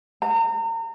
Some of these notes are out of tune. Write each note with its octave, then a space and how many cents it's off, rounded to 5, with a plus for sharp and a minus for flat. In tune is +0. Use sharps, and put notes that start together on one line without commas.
A#5 -35